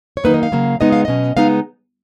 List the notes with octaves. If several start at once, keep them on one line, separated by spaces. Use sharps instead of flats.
C#5
D#3 F#3 A#3 D#4 B4
D#5
F5
C#3 F#3 A#3
C#3 G#3 B3 D#4 D#5
F5
B2 F#3 C#4 D#5
C#3 G#3 B3 D#4 F5